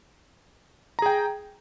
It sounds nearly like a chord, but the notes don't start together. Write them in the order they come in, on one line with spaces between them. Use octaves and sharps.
A#5 G#4 G5